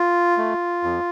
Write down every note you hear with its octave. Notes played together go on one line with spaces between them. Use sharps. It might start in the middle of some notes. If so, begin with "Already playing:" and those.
Already playing: F4
A3
F2